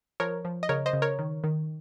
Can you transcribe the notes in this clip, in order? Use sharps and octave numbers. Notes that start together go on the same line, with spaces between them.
F3 A#4 C#5
F3
D#5
C#3 A#4 C#5
C5 D#5
C#3
A#4 C#5
D#3
D#3